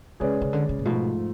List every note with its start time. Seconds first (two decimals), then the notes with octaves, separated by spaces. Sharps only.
0.20 C#3 G#3 C#4 G#4 B4 D5
0.42 C#3
0.53 D3
0.69 C#3
0.79 A2
0.85 G#2 B2 F3 A3 F4